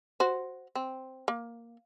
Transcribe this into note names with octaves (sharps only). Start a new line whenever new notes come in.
F#4 C5
C4
A#3